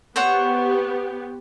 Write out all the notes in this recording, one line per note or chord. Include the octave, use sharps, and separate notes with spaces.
B3 G4 C5 C#5 F#5